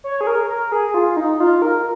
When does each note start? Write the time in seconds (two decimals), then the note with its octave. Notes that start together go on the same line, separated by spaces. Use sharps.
0.04 C#5
0.21 G#4
0.27 A#4
0.49 A#4
0.72 G#4
0.94 F4
1.17 D#4
1.40 F4
1.62 A#4